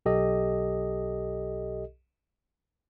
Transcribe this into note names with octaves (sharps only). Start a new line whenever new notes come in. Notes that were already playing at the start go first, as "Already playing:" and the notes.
B1 G4 A4 D#5